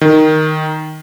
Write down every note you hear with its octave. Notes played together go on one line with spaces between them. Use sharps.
D#3